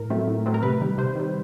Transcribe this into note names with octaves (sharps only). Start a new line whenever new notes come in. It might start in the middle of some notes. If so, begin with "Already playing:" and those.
Already playing: A2 A#4
F#3 A3 C4
A2
F#3 A3 C4
A#4
C3 B4
D#3 G3
C3 C5
D#3 G3